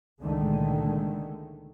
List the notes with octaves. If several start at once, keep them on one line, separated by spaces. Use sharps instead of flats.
C#2 A#2 D3 D#3 G#3 A3